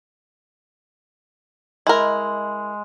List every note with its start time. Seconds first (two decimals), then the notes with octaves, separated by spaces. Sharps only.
1.87 G#3 E4 A#4